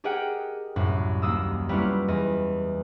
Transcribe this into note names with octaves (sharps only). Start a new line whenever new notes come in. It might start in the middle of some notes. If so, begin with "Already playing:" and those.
G4 G#4 A#4 D#5 F#5 G5
C2 F#2 A2
D#2 A#3 D#6 E6
G3 A#3 B3 C#4 E4 F4
E2 D#5